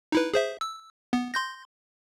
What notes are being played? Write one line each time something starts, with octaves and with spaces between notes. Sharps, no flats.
D#4 E4 B4
G#4 C5 E5
E6
B3
C6 G6 A#6